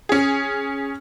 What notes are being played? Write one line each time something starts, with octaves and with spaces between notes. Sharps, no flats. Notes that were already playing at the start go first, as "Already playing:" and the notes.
C#4 G#4